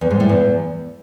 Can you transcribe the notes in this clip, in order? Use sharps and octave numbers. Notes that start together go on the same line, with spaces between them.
E2
G#2
A2
E2